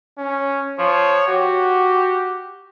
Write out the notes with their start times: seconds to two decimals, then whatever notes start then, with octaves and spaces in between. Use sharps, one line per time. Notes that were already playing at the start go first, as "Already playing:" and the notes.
0.18 C#4
0.79 F3 C#5
1.28 F#4 G4